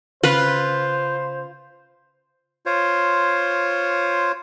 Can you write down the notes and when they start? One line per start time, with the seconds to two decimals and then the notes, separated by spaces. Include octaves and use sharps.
0.23 C#3 F4 B4 C5
2.66 F4 C5 C#5